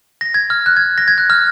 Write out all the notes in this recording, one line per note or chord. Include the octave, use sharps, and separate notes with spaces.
A#6
G#6
F6
F#6
G#6
A#6
G#6
F#6
F6